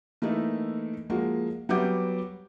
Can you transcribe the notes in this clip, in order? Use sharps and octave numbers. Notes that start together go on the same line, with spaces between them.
E3 A3 A#3 D#4 E4
F3 G#3 A#3 F#4
F#3 G3 B3 F#5 D6 G6